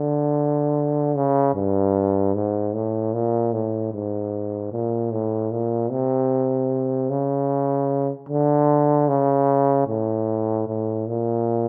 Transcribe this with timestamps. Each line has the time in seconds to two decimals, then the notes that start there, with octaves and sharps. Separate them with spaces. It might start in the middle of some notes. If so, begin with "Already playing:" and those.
Already playing: D3
1.16 C#3
1.55 G2
2.35 G#2
2.74 A2
3.14 A#2
3.53 A2
3.92 G#2
4.72 A#2
5.12 A2
5.51 A#2
5.91 C3
7.10 C#3
8.29 D3
9.08 C#3
9.87 A2
10.68 A2
11.07 A#2